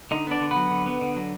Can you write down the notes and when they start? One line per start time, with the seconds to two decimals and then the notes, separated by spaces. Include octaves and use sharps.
0.11 D3 D#4 D#5
0.27 B3 D4 D5
0.41 D3
0.51 B3 B4
0.56 F#3
0.71 D3
0.86 B3
1.01 D3
1.16 F#3